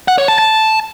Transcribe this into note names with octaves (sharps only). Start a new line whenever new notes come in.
F#5
C#5
A5
A5